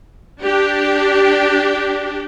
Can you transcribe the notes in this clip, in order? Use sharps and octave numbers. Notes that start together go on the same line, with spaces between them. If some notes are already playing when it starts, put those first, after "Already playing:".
D4 G4